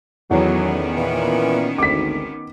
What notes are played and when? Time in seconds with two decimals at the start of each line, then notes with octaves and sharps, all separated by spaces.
0.31 E2 A2 D#3 F#3 B3 C#4
0.97 A#2 E3
1.78 G#1 D2 D6 B6